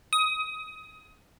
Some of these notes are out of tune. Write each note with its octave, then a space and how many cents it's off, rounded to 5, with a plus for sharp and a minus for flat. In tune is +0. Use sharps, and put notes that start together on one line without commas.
D#6 +20